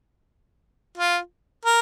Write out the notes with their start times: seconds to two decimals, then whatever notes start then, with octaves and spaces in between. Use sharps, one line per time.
0.97 F4
1.65 A#4